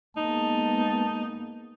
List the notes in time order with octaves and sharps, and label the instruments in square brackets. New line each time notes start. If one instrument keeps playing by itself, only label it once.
[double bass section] G#3 A#3 B3 [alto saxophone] D#4 [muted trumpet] A5